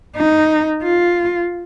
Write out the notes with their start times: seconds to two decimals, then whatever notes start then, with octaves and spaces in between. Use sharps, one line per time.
0.16 D#4
0.83 F4